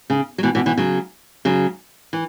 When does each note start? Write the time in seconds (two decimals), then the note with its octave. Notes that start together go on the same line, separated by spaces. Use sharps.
0.10 C#3
0.38 F#3
0.43 B2 E3
0.55 B2 E3
0.66 B2 E3
0.77 C#3 F#3
1.45 C#3 F#3
2.13 E3